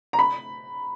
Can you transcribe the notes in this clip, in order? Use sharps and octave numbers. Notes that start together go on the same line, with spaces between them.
A#5
B5